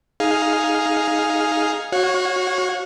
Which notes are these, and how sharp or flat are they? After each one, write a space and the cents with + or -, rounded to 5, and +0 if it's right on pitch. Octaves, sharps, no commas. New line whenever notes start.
D#4 +15 G#4 +0 F5 +0
F#4 +0 C#5 -15 F5 +45